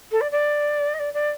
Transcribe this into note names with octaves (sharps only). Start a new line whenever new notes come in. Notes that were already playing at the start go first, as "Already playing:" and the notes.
A4
D5
D5
D#5
D5
D5